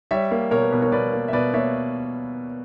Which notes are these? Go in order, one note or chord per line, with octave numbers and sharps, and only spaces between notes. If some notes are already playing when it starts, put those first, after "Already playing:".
G3 C#5 E5
A#3
B2 A#4 C#5
B4
B2 B4
A#4 C#5
B2 B4 D5
A#3
E5
B2 B4 D5
A#3 C#5 E5